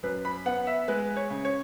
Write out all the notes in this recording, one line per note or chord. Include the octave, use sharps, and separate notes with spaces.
F#2 B4
B5
B3 F#5
E5
G#3 B4
C#5
C#3
C#5